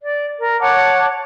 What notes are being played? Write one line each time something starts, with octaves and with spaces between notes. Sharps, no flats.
D5
A#4
C#5 F#5 A5 D6